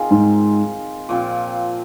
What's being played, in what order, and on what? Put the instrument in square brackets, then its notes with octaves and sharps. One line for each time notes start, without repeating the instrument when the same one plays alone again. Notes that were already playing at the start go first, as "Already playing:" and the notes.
Already playing: [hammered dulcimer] D#3 C4 F4 G#4
[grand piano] G#2
[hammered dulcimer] A#2 F3 C4